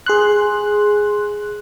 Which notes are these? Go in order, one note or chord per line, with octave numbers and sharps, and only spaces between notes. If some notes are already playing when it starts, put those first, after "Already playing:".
G#4 C6 F#6